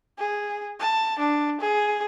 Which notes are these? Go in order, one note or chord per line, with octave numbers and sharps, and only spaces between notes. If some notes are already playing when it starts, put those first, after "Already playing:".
G#4
A5
D4
G#4